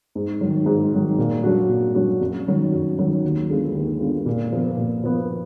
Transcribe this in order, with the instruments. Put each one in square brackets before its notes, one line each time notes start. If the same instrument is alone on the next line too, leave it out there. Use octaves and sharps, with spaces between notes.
[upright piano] G#2
D#3 F#3
G#2
D#3 F#3
A#2
F#3 D4 F#4
A#2
F#3 D4 F#4
F#2
D#3 F#3
F#2
D#3 F#3
D#2
D3 G#3 B3 F4
D#2
D3 G#3 B3 F4
A#2
F3 B3
A#2
F3 B3